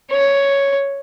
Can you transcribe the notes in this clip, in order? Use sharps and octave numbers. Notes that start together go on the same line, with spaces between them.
C#5